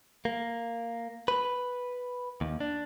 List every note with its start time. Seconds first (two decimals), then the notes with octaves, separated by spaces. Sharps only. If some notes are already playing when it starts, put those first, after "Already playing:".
0.25 A#3
1.28 B4
2.41 D#2
2.60 D4